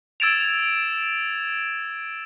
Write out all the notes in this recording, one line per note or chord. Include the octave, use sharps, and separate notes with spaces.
E6 G#6 A6 D7 E7 F7